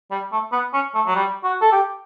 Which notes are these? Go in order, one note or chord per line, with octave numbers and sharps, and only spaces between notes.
G3
A3
B3
C#4
A3
F#3
G3
F#4
A4
G4